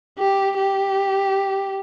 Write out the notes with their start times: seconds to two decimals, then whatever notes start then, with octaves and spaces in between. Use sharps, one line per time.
0.19 G4
0.57 G4